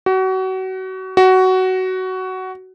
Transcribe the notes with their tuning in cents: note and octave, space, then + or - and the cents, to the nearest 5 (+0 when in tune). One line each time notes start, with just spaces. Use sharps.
F#4 +30
F#4 +15